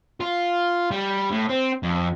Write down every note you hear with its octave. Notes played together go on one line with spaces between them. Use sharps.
F4
G3
A2
C4
F2